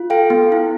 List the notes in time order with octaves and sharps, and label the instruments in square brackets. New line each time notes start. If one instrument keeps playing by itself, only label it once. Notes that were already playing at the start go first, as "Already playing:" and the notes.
Already playing: [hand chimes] F4
A4 F5 G5
B3
E4